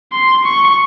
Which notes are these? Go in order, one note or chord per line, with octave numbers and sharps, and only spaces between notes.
C6
C#6